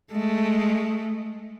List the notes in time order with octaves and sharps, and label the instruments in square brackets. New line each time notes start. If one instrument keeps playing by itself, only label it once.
[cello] G#3 A3